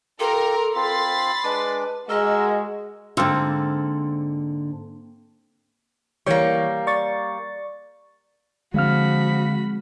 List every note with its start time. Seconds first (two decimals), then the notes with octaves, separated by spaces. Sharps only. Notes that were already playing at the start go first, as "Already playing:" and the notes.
0.20 F4 G4 A4 A#4
0.75 C4 F4 B5 A6 C7
1.44 G#3 D4 B4 D6
2.09 G#3 F#4 A#4 D#5 E6
3.17 G#2 D3 A#3 C4 A4
6.26 E3 G3 A#3 C#5 C#6
6.87 D5 C#6 A6
8.74 D3 F3 G#3 C4 F#4 F5 B5 F6